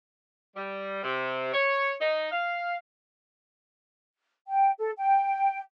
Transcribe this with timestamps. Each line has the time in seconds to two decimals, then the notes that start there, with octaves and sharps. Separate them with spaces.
0.56 G3
1.03 C3
1.53 C#5
2.00 D#4
2.31 F5
4.48 G5
4.79 A4
4.98 G5